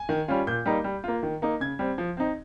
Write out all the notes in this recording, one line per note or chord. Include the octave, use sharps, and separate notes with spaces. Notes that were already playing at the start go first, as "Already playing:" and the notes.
Already playing: G#5
D#3
G3 C#4 F4
A#2 G6
G3 A#3 D#4
G3
A#3 F4
D#3
A#3 D#4
C#3 G#6
G3 C4
F3
C4 D#4